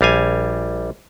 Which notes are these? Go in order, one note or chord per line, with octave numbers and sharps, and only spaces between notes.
A#1 G3 F5 G#5